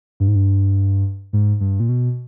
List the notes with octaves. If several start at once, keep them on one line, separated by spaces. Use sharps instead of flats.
G2
G#2
G2
G#2
G2
A#2
B2